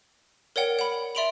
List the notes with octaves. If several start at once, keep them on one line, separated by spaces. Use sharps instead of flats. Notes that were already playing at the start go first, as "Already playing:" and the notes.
A#4 C#5 D5 F#5 G5
F#5 B5
D5 E5 C6 D7 F7 F#7